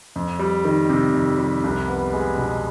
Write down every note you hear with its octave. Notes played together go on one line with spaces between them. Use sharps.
F2
G3
D#3
C3
F2
G3
C2
B3
G#3
B2